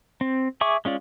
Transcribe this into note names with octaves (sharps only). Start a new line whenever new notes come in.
C4
G#4 E5 C#6 D6
G#3 C#4 F4 D5